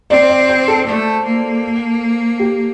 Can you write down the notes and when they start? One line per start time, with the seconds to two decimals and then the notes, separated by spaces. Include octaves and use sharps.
0.10 C4 D5
0.29 D5
0.49 C5
0.68 A4
0.86 A3
1.25 A#3
2.40 G4